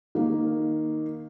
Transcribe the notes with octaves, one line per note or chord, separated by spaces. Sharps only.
D#3 A#3